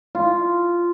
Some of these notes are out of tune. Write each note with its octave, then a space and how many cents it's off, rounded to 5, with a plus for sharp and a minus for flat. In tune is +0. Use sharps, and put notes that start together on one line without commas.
F4 -10